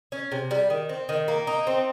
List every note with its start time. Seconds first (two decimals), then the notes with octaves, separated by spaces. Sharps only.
0.12 C#4
0.32 C3
0.51 G3
0.70 D#3
0.89 C4
1.09 D#3
1.28 A#3
1.47 D#4
1.67 C4